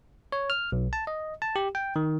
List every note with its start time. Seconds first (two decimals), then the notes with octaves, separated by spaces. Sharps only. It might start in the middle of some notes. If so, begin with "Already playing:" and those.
0.32 C#5
0.50 F6
0.72 B1
0.93 A5
1.07 D#5
1.42 A5
1.56 G4
1.75 G5
1.96 D#3